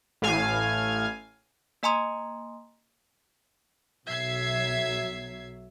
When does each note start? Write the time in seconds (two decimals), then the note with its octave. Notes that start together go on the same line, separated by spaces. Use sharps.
0.22 A1 A2 F5 G#5
1.83 A#3 D#5 G#5 A#5 C6 D#6
4.07 B1 F#3 E5 G#6 C7